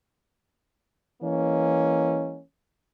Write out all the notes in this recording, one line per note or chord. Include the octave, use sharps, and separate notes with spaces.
E3 G#3 A#3 C#4